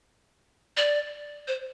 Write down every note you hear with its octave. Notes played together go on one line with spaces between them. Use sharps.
D5
C5